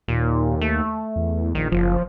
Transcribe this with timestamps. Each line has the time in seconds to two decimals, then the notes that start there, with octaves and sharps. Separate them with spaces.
0.08 D#2 A#2
0.61 A3
1.16 E2
1.55 A#1 D#3
1.72 F#1 F3